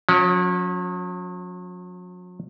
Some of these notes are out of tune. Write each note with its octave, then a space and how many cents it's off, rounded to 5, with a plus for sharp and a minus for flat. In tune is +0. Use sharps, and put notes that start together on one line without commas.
F#3 -45 C#4 +0